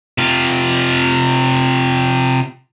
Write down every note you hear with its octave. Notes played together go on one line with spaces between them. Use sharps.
C3 F4